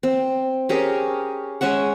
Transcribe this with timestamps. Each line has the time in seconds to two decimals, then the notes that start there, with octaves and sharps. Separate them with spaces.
0.03 C4
0.69 C#4 G4 G#4 A#4
1.61 G#3 C#4 E5 F#5